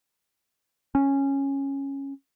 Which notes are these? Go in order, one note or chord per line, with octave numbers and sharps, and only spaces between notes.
C#4